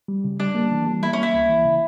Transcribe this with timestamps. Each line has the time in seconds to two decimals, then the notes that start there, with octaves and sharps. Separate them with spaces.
0.08 G3
0.24 C#3
0.40 G3 D4
0.55 A#3
0.72 E3
0.87 G3
1.02 A#3 E4
1.13 C#4
1.18 A#3
1.23 E4
1.34 C#2
1.49 E3
1.65 C#3